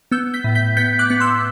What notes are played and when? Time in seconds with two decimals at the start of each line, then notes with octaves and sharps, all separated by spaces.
0.11 B3 E6 G6
0.34 G6 B6
0.44 A2
0.55 G6 B6
0.77 B3 G6 B6
0.99 D6 F#6
1.10 B3 F#6
1.20 C6 E6